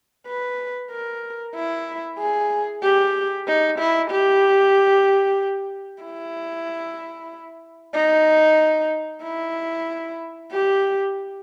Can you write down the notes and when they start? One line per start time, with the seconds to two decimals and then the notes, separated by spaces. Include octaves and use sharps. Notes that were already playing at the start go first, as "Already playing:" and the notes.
0.27 B4
0.90 A#4
1.55 E4
2.18 G#4
2.82 G4
3.47 D#4
3.79 E4
4.10 G4
6.03 E4
7.95 D#4
9.23 E4
10.51 G4